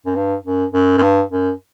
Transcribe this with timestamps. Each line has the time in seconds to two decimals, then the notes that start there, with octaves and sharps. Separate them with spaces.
0.06 F#2
0.15 G2
0.45 F#2
0.74 F#2
0.98 F#2
1.02 G2
1.31 F#2